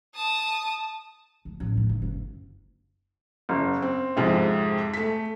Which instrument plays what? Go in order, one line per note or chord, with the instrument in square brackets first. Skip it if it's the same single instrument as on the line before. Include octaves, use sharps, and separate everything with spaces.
[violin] A5 D#6
[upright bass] D2
A1
E2 A2
G1
F#1 A#3
[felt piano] F#1
C4
F2 G#2 C3
A3 B6